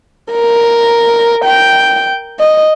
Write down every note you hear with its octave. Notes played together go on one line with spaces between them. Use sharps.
A#4
G5
D#5